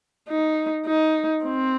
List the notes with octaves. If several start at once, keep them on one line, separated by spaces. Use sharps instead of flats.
D#4
D#4
C4